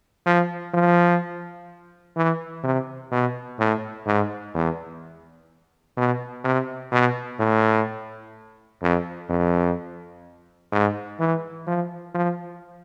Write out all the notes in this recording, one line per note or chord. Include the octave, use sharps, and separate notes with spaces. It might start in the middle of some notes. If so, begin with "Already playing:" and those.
F3
F3
E3
C3
B2
A2
G#2
E2
B2
C3
B2
A2
F2
F2
G#2
E3
F3
F3